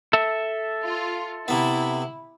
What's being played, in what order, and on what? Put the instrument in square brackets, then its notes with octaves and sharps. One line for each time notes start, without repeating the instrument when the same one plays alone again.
[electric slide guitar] A4 E5
[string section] F4
[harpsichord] C3 B3 [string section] E4